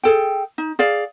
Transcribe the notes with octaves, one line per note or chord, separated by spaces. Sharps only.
G#4 A4 G5
D#4
G#4 D5 F5